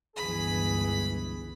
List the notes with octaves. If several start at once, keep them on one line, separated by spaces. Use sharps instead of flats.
G1 C#2 E3 G#4 B5